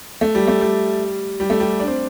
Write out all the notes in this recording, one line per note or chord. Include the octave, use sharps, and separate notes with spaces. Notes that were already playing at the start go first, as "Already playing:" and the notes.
A3
G3
A3
G3
G3
A3
G3
D4
C4